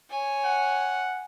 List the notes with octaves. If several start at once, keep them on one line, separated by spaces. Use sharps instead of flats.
C#5 G#5
F#5